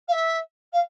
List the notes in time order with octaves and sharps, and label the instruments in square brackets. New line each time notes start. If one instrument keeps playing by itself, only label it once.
[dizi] F5
E5
F5